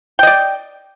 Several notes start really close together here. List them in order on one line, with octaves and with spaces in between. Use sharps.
G5 D#5 D5